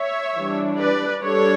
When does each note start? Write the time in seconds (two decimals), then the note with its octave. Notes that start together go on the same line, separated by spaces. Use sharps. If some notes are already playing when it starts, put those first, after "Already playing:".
Already playing: C#5 E5
0.37 E3 G3 D4
0.79 B4 D5
1.23 G3 D4 A4 C#5